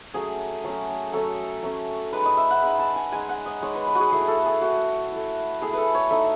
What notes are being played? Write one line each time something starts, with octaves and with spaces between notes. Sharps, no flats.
F#3 A3 C#4 G#4
F#3 A3 C#4
F#3 A3 C#4 A4
F#3 A3 C#4
G#3 D#4 B4
D#5
E5
F#5
G#3 D#4 B5
A5
G#5
G#3 D#4 G#5
F#5
D#5
G#3 D#4 C#5
B4
B4
F#4 G#4
A3 E4 G#4
A4
G#4
A3 E4 F#4
A3 E4
A3 E4 G#4
A4 B4
C#5
A3 D#4 E5